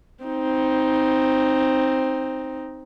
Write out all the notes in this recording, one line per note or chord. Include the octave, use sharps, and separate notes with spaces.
C4 D#4